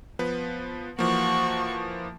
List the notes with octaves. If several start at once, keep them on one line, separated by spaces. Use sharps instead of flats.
F3 B3 B4
E3 F3 A#3 F#4 C#6